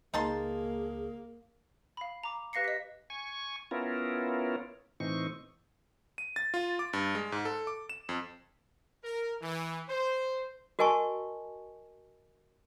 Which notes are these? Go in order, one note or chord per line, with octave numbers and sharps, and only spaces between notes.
C#2 A#3 D#4 G#4 A5 C6
F5 B5
A#5 D6
G4 B4 F5 A#6 C7 C#7
D#5 B6
G#5 C#6
B3 C#4 E4 F4 A#4
A2 E3 C4 D#4 C#6
D#7
A6
F4
D6
G2
G#3
G#2
A4
D6
E7
F2
A#4
E3
C5
F#4 A#4 D#5 G#5 A5 C#6